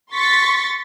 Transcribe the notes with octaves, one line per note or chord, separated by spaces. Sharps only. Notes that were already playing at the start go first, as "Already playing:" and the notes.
C6 C#6 A6 B6